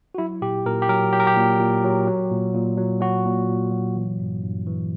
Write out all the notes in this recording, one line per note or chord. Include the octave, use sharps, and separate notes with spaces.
F#4
F#3 E4
A#2 G4
A#2 A#4
G4
F#3 A#4
F#3 G4
A#4
G4
A#2
A#2
F#3
F#3
A#2
A#2
F#3
F#3 F#4
A#2
A#2
F#3
E3
G2
G2
E3